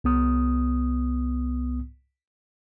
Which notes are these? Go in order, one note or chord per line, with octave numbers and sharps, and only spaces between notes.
C2 B3 D#6